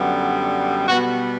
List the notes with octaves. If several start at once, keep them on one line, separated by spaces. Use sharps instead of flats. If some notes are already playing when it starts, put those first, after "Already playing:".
Already playing: F#2 D3 G3 B3
B2 G3 B3 F#4